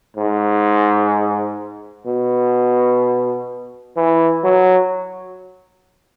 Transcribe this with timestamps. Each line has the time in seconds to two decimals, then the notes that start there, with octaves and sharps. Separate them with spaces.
0.16 G#2
2.06 B2
3.96 E3
4.44 F#3